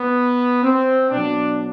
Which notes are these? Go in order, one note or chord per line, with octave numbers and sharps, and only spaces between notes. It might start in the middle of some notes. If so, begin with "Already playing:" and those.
Already playing: B3
C4
B2 F#3 D4